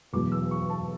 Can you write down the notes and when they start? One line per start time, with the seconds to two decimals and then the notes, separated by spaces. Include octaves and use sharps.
0.13 E2 B2 F#3 D6
0.32 E6
0.51 C#6
0.70 A5